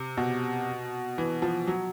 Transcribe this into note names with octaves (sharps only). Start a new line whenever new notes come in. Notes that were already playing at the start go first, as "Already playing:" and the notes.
Already playing: C3
B2
E3
F3
F#3